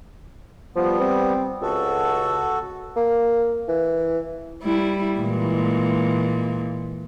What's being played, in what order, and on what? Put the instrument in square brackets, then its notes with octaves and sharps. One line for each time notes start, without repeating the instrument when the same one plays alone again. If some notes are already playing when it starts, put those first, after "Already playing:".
[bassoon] F3 [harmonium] G3 B3
[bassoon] C4
[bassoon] C#2 [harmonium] F#4 A4
[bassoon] A#3
E3
[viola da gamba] G3 E4
A#2 E3 G#3